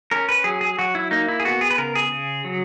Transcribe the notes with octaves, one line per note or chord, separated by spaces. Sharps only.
C#4 A#4
B4
F#3 G#4
G#4
F#3 F#4
E4
A#3 D#4
E4
G#4
B3 F#4
G#4
B4
C#3 A#4
G#4
C#3
F#3